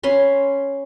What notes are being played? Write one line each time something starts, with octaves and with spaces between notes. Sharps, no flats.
C#4 B5 C6